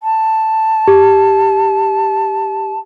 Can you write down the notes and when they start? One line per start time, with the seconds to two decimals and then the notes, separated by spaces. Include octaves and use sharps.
0.03 A5
0.88 G4